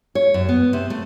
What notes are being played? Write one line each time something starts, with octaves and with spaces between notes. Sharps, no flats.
C#5
F#2
B3
C3
A3